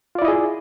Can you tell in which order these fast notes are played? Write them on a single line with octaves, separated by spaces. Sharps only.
F4 D5 E4 D#5 G#4